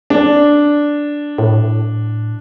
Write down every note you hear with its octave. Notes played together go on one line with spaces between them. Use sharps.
D4
A2